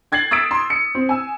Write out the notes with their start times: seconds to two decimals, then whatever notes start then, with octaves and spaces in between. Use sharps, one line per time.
0.12 G5 G#6 A6 C7 F#7
0.31 D#6 E6 A6 B6 D7
0.51 C6
0.70 C#7
0.95 C4
1.09 G#5 E6